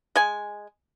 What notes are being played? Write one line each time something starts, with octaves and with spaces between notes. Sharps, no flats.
G#3 G#5